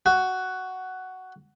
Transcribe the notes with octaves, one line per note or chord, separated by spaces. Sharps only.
F#4